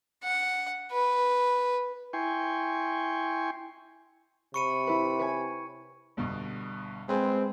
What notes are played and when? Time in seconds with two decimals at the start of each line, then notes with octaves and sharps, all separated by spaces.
0.24 F#5
0.92 B4
2.13 E4 G5 G#5 C6 C#6
4.54 C3 B5 C#6 C#7 D#7
4.87 E4 B4
5.19 B4 C#5 G#5
6.17 G1 G2 B2
7.09 G#3 C4 G#4 B4